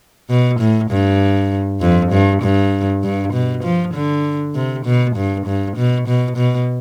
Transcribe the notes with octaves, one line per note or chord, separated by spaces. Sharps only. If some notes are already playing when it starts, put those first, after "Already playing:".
B2
A2
G2
F2
G2
G2
G2
B2
F3
D3
C3
B2
G2
G2
B2
B2
B2